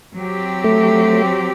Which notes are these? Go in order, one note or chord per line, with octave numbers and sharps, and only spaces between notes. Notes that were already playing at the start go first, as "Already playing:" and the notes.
F#3 C4 G4
A3